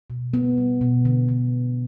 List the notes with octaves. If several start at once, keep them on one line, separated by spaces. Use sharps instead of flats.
B2
B3
G3
B2
D3
D3